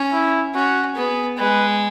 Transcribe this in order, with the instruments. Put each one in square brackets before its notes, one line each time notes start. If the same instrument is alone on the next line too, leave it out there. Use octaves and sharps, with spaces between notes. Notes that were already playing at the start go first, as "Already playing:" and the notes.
Already playing: [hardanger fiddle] C#4
[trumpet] E4
[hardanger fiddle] C#4 [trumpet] F#4
[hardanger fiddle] B3 [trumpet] G#4
[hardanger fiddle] G#3 [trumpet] B4